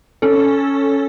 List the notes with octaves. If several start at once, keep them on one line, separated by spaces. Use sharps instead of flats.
C#4 A4